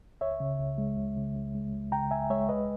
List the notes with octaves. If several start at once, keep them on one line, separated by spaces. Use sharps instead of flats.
C#2 C#5 E5
C#3
C#2
G#3
C#2
C#3
C#2
G#3
C#2
C#3 G5 A#5
C#2 E5 G#5
G#3 C#5 E5
C#2 B4 D#5